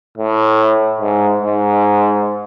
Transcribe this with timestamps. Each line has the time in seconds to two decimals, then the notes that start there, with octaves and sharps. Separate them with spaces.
0.18 A2
1.01 G#2
1.43 G#2